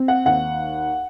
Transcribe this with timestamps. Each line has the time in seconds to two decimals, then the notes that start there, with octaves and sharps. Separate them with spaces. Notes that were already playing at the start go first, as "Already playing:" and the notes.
Already playing: C4
0.08 F#5
0.25 D#2 F#5